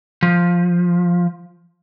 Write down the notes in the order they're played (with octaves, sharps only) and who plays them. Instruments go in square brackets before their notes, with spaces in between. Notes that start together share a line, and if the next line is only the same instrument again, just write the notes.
[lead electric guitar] F3